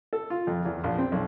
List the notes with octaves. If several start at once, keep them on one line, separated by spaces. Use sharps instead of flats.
A4
F4
F2
E2
A#1
C4
B1